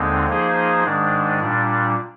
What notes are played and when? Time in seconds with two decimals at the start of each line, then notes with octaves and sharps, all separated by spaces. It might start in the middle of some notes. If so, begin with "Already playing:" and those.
Already playing: D#2 D3 G#3 C4 D#4
0.28 F3 A#3 D#4 G#4 C5
0.84 G#2 D#3 G#3 D4
1.40 A#2 G3 D4